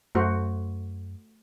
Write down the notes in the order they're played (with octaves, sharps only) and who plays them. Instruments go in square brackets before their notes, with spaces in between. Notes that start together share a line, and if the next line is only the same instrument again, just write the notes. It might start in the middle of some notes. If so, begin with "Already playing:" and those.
[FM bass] F#2 [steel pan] A3 F#4 C5